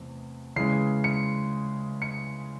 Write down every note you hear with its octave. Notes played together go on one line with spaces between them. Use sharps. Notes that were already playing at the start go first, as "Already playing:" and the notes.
Already playing: E2 C3 A3
C#3 E3 G#3 C7
C#7
C#7